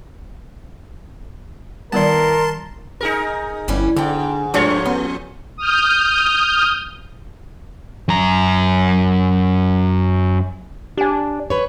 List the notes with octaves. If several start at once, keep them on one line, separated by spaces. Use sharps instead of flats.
D#3 G3 B3 E4 A#4 D5 A5 C6
D#4 G#4 A#4
G1 E3 G3 C#4
G#2 B2 D3 G5
D#2 G#2 F3 A3 D4 F4 C#5
B3 C#4
D#6 F6 G6
F#2 A#5
D4 G4 G#5
B4 C#5